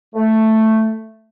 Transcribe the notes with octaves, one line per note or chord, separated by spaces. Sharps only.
A3